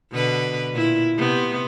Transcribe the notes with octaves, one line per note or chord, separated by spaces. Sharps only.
B2 D3 B4
A#2 E4
C3 B3